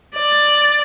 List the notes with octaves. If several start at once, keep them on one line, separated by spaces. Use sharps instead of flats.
D5